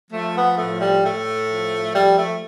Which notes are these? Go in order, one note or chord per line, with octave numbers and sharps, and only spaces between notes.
F3 A3
B3
A2 A3
G3
A2 A3
F3
F3 G3
A3